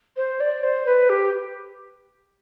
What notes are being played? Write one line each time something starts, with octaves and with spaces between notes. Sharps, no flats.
C5
D5
C5
B4
G4